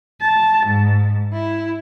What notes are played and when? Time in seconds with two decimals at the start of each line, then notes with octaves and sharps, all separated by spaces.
0.20 A5
0.66 G#2
1.31 E4